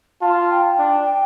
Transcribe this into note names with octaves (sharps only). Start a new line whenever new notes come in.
F4 A5
G5
D4